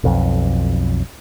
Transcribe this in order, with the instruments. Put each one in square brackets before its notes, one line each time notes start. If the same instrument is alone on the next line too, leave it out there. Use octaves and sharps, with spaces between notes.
[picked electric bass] B1 F2